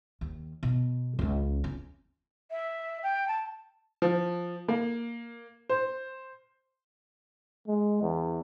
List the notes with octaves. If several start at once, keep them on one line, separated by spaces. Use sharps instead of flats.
D#2
B2
C#2 C#4
C#4
E5
G5
A5
F3
A#3
C5
G#3
E2